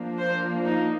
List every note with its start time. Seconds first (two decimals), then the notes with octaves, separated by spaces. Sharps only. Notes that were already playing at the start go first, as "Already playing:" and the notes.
Already playing: F3 A#3 D4
0.18 C5
0.65 D#4